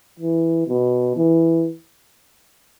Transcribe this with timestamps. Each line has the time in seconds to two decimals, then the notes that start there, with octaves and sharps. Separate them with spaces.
0.20 E3
0.67 B2
1.16 E3